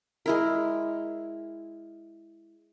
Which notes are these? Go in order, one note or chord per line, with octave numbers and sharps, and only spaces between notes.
G#3 E4 A#4